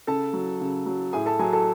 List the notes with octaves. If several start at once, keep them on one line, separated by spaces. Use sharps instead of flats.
C#3 A4 A5
F#3
C#3
F#3
A2 G#4 G#5
A4 A5
F#3 G#4 G#5
A4 A5